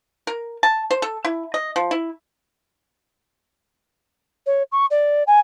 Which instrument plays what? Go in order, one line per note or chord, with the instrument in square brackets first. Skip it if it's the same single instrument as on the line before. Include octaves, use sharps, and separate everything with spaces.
[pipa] A#4
A5
C5
A4
E4
D#5
F3
E4
[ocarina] C#5
C#6
D5
G#5